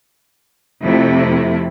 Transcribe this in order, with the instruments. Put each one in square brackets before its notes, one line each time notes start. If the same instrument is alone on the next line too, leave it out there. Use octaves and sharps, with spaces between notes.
[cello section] F2 C3 A3 E4